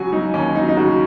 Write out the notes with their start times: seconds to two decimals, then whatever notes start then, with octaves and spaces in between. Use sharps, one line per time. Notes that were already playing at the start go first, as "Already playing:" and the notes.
Already playing: C#3 F#3 F#4 G#5
0.12 F#3 D#4
0.34 D#2 C#4
0.55 F#3 D#4
0.68 D#4
0.77 C#3 F#4